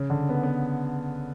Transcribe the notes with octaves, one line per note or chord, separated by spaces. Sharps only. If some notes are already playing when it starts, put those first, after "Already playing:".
Already playing: C#3
D3
B3
B3